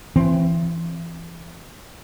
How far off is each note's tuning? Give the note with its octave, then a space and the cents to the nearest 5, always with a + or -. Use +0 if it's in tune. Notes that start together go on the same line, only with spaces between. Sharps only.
E3 +30 C4 +0